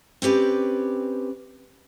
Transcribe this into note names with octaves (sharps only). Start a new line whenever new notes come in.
C4 C#4 G4 B4 D5